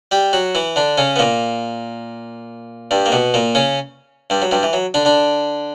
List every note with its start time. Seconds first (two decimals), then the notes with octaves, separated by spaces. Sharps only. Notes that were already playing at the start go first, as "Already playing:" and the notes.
0.11 G3 G4
0.33 F#3 F#4
0.55 E3 E4
0.76 D3 D4
0.98 C#3 C#4
1.16 B3
1.19 A#2 A#3
2.91 G2 G3
3.06 A#3
3.12 B2 B3
3.34 A#2 A#3
3.55 C#3 C#4
4.30 G2 G3
4.42 F#3
4.51 G2 G3
4.63 E3
4.73 F#3
4.94 D3 D4
5.05 D3 D4